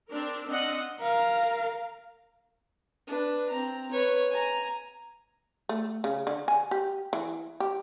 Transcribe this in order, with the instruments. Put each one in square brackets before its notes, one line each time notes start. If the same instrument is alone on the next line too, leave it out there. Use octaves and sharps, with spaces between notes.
[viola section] C4 D4 A#4
C4 D4 D#5 F5 F#5
[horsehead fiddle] A#4 F5
[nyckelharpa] D4 B4
C4 A#5
B4 C#5
G#5 A#5
[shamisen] A3
C#3
D3
G#5
G4
E3
G4